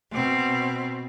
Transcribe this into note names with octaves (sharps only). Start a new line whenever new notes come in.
B2 C4